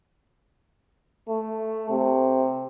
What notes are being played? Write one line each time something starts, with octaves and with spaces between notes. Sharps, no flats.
A3
C3